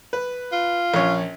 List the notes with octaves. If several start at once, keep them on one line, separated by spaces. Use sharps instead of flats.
B4
F4
A#1 C#4 C#5